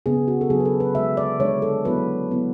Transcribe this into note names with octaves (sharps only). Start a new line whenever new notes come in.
C#3 F#3 B3 D4 G#4
F#4
A4
C#3 F#3 B3 D4 G#4
B4
A4
B4
D3 G#3 D4 E5
D5
D3 G#3 D4 C#5
A4
F#3 B3 E4 B4
F#3 B3 E4